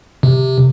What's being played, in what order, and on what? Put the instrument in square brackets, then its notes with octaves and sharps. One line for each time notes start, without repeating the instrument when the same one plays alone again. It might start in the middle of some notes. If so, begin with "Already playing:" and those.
[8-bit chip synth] C3